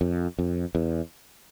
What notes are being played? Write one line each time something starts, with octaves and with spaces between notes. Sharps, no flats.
F2
F2
E2